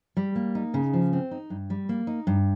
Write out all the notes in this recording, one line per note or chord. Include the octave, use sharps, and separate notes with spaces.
G3
A#3
D#4
C#3
F3
C4
D#4
G2
G3
A#3
D#4
G2